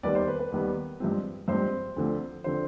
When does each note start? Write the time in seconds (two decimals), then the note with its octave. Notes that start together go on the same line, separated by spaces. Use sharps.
0.03 D#2 D#3 G3 B3 B4 D5
0.15 C5
0.28 B4
0.39 B4
0.52 D#2 D#3 G3 B3
1.00 G2 F3 G#3 C4
1.48 G2 F3 G#3 C4 C5
1.97 D2 D3 F3 C4
2.44 D3 F3 C4 C5